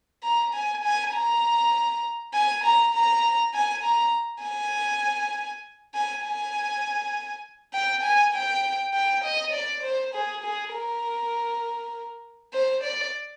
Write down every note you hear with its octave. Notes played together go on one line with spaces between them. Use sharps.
A#5
G#5
G#5
A#5
G#5
A#5
A#5
G#5
A#5
G#5
G#5
G#5
G5
G#5
G5
G5
D#5
D5
C5
G#4
G#4
A#4
C5
D5